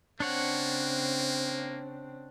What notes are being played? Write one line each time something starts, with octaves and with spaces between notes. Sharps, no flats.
C#3 A#3 C4 D4 C#5 F#5